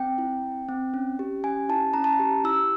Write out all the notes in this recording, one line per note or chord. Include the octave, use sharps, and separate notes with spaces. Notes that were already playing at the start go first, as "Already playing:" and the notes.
Already playing: C4 G5
E4
C4
C4
C#4
G4
C#4 G#5
E4 A5
C#4 A#5
A5
A#5
G4
E4 E6